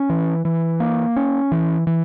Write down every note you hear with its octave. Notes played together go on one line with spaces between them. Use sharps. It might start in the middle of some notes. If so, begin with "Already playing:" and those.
Already playing: C#4
E3
E3
A#3
C#4
E3
E3